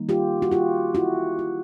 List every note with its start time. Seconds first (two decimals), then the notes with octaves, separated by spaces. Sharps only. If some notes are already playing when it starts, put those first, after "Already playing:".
Already playing: D#3 G3 A#3 D#4
0.09 F4 G4
0.42 F#4
0.51 F4 G4
0.95 E4 F#4
1.39 F4